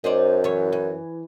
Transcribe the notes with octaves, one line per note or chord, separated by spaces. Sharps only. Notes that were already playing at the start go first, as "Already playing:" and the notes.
F#2 D#4 C5 D5
E3 C#5
E3